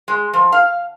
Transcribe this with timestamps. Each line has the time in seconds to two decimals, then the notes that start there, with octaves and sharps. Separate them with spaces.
0.08 G#3
0.33 F3
0.52 F5